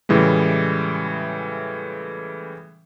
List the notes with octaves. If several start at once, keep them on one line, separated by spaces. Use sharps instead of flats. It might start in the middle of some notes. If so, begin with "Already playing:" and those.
A2 C#3 E3 G3 G#3